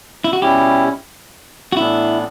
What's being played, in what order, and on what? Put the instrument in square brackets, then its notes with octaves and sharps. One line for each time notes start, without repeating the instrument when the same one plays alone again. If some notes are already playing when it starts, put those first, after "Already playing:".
[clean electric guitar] E4
F#4
[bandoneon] B2 G3 C#4 E4 [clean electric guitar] G4
[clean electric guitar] F#4
[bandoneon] A2 E3 B3 D4 [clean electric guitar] E4